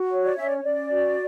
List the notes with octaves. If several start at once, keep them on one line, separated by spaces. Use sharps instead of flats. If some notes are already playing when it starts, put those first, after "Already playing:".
Already playing: F#4
C#5
D5
C#4 E5
D5
C#4 D5
F#4